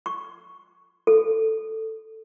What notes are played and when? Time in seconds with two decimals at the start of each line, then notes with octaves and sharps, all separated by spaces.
0.06 C#6
1.07 A4